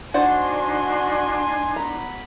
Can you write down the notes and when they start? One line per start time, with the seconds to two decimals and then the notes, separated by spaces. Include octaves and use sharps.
0.14 D4 D#4 F#4 C5 D5 F#5 G#5 C6
1.76 F#3 B3 A#5 B5